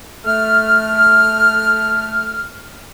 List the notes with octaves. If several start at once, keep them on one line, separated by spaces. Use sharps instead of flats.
A3 F6